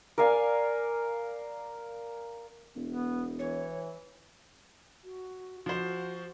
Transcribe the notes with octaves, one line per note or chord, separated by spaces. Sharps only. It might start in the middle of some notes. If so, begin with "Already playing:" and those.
A#4 D5 F5 G#5
E1
B3
E3 C#5
F#4
F3 F#4 C5